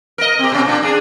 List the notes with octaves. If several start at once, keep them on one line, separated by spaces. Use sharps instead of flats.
A#4 D#5
C4 G4
B2 C4 C#4
A#2 D4
D4 G#4